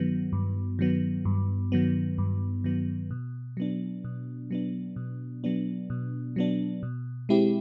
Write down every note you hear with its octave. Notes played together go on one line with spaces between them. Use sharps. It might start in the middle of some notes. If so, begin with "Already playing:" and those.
Already playing: G2 D#3 F#3 B3
G2
D#3 F#3 B3
G2
D#3 F#3 B3
G2
D#3 F#3 B3
B2
F#3 B3 D4
B2
F#3 B3 D4
B2
F#3 B3 D4
B2
F#3 B3 D4
B2
G#3 C4 E4 G4